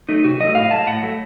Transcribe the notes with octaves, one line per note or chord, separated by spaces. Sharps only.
F#3 A3 D#4
C3 F#4
F#3 A3 D#5
A2 F5
F#3 A3 A5
A2 F#5
F#3 A3